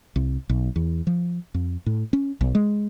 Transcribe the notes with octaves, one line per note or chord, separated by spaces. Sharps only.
C2
B1
E2
F3
F2
A2
C#4
B1
G#3